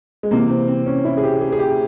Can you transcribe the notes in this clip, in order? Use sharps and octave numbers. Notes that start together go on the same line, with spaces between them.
G#3
C3 E3 A#3
C4
C4
C#4
E4
G#4
G4
G#4
G#4
G4